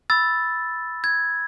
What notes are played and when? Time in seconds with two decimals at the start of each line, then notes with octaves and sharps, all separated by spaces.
0.10 B5 E6 A6
1.04 G#6